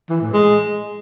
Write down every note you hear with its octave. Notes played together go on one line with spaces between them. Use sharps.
E3
A2
G#3